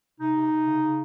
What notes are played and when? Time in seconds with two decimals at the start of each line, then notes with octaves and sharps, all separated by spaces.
0.20 C3 D#4
0.36 C3
0.52 C3
0.67 C#3
0.82 C#3